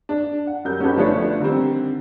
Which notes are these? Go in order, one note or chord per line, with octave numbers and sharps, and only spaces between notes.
D4
F#5
F#2 G3 A#4 G6
C#4 D#4 F#4 G4 A4 B4
G1 F3 A3 D4 B4 C#5
D3 D#3 G3 C4